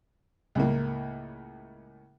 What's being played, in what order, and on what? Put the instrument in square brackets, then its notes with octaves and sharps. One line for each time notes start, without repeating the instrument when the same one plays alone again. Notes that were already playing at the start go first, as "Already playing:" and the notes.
[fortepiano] C#2 A2 A#3